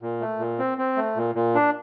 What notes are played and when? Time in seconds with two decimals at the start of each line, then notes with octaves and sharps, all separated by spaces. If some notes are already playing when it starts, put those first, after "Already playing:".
0.02 A#2
0.21 A3
0.39 A#2
0.59 C4
0.78 C4
0.97 A3
1.16 A#2
1.35 A#2
1.55 D4